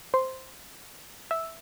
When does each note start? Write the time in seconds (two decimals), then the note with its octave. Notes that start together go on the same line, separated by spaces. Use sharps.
0.14 C5 C6
1.31 E5 E6